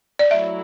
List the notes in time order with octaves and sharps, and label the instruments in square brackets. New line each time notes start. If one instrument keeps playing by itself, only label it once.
[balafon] D5
[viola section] F#3 A3 E4 [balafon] E5